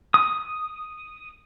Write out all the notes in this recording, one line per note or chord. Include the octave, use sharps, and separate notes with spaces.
D#6